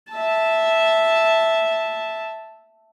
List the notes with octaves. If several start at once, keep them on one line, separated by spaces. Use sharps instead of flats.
E5 A5